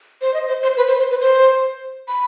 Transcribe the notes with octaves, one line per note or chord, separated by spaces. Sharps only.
C5
D#5
C5
C5
B4
C5
C5
B4
C5
B5